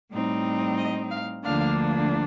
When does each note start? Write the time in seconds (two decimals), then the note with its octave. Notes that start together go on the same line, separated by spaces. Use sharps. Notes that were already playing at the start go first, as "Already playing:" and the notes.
0.11 A2 G3 C4 D#4
0.77 D#5
1.10 F5
1.44 D2 D3 F3 A#3 D4 F5